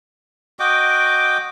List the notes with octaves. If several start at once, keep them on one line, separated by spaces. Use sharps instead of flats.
F#4 D#5 G5 D6